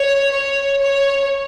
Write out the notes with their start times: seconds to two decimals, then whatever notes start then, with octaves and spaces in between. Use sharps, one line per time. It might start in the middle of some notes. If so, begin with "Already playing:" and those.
Already playing: C#5
0.31 C#5
0.81 C#5